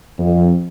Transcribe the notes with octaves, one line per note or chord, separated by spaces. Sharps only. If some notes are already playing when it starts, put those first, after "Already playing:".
F2